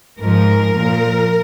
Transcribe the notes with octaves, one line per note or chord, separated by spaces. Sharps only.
G#2 F3 A#4
A#2 F3